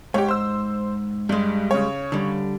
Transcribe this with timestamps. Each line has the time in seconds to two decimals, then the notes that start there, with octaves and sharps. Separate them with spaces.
0.14 G#2 G4 C#5
0.28 C5 E6
1.29 G2 G3 G#3
1.71 C#3 C#5
2.12 D3 G3